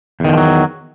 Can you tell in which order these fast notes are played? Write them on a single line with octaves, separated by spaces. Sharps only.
E2 D#3 D3 F3 F#3